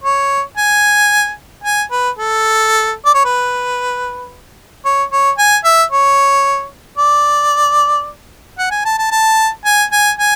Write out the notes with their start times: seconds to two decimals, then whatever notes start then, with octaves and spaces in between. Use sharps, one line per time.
0.04 C#5
0.57 G#5
1.64 G#5
1.91 B4
2.18 A4
3.06 D5
3.14 C#5
3.25 B4
4.85 C#5
5.12 C#5
5.38 G#5
5.64 E5
5.92 C#5
6.98 D5
8.59 F#5
8.71 G#5
8.85 A5
8.98 A5
9.11 A5
9.65 G#5
9.92 G#5
10.19 G#5